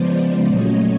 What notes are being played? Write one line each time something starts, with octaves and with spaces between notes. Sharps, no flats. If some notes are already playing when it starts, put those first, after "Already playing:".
Already playing: C#3 F3 G#3 B3 C5 D5
A#2 F#3 A3 C#4 C#5 D#5